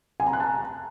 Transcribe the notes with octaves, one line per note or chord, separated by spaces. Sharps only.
G#5
A#5
F#6
A5